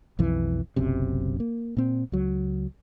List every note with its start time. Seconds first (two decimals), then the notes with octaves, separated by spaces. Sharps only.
0.19 B1 F2 E3
0.76 F#1 B1 F#2 C3
1.40 A#3
1.77 A#2 C4
2.12 C#2 F#3